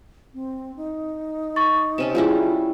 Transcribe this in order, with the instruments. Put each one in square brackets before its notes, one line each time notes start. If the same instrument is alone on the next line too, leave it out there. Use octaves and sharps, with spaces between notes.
[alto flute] C4
D#4
[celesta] C#6 A6
[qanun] C3 C#4 A5 [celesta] E7
[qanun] G3 C#4 E4 [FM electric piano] F4 G#4